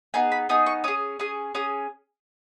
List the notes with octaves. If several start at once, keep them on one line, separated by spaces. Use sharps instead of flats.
B3 D#4 G#4 G#5
B5
B3 D#4 G#4 D#6
C#6
C#4 G#4 D#6
C#4 G#4 D#6
C#4 G#4 D#6